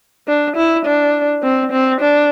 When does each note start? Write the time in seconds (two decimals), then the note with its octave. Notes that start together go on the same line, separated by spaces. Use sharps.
0.28 D4
0.57 E4
0.85 D4
1.43 C4
1.72 C4
2.01 D4